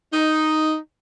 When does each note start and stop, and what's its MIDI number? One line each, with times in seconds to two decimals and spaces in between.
0.13 0.77 63